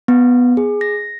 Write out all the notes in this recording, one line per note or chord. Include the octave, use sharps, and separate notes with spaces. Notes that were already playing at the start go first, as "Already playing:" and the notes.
B3
G#4
A#6